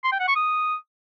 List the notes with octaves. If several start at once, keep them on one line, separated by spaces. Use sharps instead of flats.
C6
G5
F#5
C#6
D#6